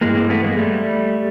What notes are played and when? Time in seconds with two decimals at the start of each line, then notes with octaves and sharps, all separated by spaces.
0.01 G2 E3 G#3 A#3
0.15 A#3 C4
0.30 A3 B3
0.44 G#3 A#3
0.58 G3 A3